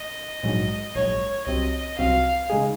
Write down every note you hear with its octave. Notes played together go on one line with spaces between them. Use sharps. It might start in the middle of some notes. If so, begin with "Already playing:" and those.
Already playing: D#5
A#1 G#2 F#3
A#1 G#2 F#3 C#5
C2 C3 F#3 C4 D#5
C2 C3 F#3 C4 F5
C#3 G#3 D#4 G#4